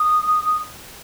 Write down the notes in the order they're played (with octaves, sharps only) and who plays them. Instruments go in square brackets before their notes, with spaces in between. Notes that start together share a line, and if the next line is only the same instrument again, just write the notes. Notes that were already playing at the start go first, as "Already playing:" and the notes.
Already playing: [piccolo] D#6